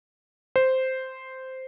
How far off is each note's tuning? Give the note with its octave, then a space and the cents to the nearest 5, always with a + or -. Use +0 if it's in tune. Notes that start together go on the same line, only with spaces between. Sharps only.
C5 -5